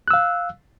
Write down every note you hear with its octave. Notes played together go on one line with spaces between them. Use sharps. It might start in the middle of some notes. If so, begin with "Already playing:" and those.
F5 E6 F#6